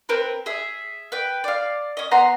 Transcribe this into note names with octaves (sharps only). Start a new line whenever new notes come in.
C4 A#4 B4
G#4 E5
B4 G5
D5 F5
C#4 D#5
B3 F#5 A#5 C6